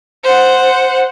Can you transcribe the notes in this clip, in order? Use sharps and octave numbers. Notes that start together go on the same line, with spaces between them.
C5 F#5